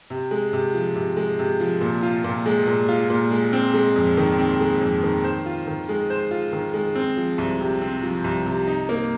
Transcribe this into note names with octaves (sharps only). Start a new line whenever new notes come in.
C3
G#3
C3
F3
C3
G#3
C3
F3
A#2
F4
A#2
G#3
A#2
F4
A#2
G#3
C4
G#3
F2
D#3
C4
G#3
F2
D#3
C5
F4
D#3
G#3
C5
F4
D#3
G#3
C4
F3
C2
C3
C4
F3
C2
C3
D#4
A#3